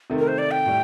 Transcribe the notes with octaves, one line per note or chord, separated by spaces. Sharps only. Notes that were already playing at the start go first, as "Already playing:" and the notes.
C3 D#3 A3
A#4
C5
D5
G5
A2 G3